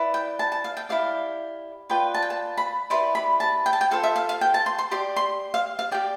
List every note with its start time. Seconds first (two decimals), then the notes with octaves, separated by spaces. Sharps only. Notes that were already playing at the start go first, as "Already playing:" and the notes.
Already playing: E4 B4 D5
0.14 G5
0.39 A5
0.52 A5
0.64 F5
0.77 G5
0.89 E4 G4 D5 F5
1.90 F4 B4 D5 G5
2.14 A5
2.22 G5
2.30 A5
2.57 B5
2.90 E4 G4 B4 D5 C6
3.15 B5
3.40 A5
3.66 G5
3.73 A5
3.81 G5
3.91 F4 A4 C5 F5
4.03 E5
4.16 F5
4.29 F5
4.41 G5
4.54 A5
4.66 C6
4.78 C6
4.91 G4 D5 C6
5.16 C6
5.54 F5
5.79 F5
5.91 G4 D5 G5